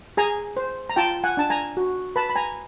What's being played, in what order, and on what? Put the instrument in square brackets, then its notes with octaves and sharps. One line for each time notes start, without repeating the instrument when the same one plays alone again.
[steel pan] G#4 G#5 A#5
C5
A#5
F4 G5 A5
F#5 G#5
D4 A5
G#5 A#5
F#4
B4 A5 B5
B5
G#5 A#5